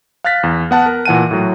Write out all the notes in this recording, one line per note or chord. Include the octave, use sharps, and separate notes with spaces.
F5 F6 F#6 A6 B6
E2
B3 F#5 A5 F#6
A#4
A#2 E3 F#5 A5 D#7
A2 F#3